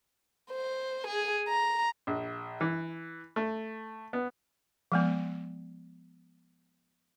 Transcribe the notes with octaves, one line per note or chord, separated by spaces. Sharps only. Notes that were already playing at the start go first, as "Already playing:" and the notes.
C5
G#4
A#5
A#1
E3
A3
B3
F3 G#3 B3